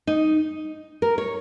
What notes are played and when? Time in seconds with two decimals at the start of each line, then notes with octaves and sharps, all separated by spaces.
0.07 D#4
1.02 A#4
1.18 C#5